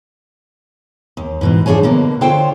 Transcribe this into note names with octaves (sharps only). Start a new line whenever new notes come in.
D#2
G#2 B2 E3
G#2 F3 D4 G#4 C#5 G#5
B2 D3 A#3
D3 F4 A4 C5 C#5 G5